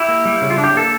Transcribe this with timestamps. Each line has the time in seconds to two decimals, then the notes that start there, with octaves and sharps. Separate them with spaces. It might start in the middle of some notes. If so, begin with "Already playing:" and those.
Already playing: E4 G4
0.09 A#3
0.25 G3
0.42 C#3
0.50 F4
0.58 D4
0.64 G4
0.75 A#3 A4